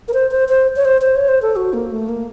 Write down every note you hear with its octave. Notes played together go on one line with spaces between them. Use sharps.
A#4
C5
C5
C5
C#5
C5
C5
C#5
C5
A4
F#4
A#3
A3
A#3